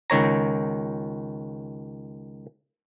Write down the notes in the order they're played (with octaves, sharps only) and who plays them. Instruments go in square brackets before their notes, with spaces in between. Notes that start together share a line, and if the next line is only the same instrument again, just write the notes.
[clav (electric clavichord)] C#2 D#3 C#5 A#5